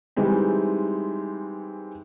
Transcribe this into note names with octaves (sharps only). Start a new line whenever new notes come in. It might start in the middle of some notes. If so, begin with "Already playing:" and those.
E3 G3 G#3 C4 D#4